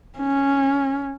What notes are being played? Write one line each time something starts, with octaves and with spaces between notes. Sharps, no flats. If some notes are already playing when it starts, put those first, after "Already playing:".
C#4